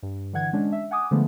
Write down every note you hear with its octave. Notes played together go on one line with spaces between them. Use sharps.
G2
D3 E3 F#5 G#6
G#3 C#4 D4
E5
F#5 G#5 D6 D#6
D3 F3 G#3 A3 B3